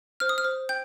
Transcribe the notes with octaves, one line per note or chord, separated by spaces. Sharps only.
C5 F6
D#6
F6
C5
G5 G6